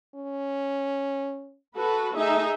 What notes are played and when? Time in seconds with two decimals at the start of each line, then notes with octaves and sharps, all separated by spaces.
0.15 C#4
1.76 F#4 A4 B4
2.17 A3 D#4 G#4 E5